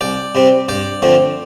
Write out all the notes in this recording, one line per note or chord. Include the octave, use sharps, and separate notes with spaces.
C2 D5 G5
C3 G3 C4
G2 D5 G5
D3 F3 A3 C4